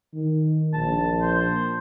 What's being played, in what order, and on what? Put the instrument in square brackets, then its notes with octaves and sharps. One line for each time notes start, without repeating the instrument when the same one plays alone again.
[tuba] D#3
[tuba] A#1 [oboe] A5
[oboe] C5